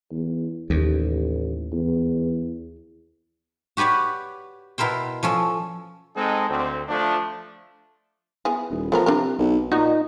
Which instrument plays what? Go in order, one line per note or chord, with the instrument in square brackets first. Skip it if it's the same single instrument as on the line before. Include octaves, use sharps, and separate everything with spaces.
[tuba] E2
[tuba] A1 [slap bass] D#2
[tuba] E2
[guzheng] F#4 G4 B4 C#5 D5
B2 E4 A#4 C5 G5
F3 C#4 A4
[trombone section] G#3 C4 D#4 A4
D2 C4
F3 A3 D4
[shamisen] B3 E4 G#4
[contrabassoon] D#1
[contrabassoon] F3 [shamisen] A3 B3 A#4
[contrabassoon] C3 [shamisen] D4 E4 A#4
[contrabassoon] B1
[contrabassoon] A#2 [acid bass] D#4 [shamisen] F#4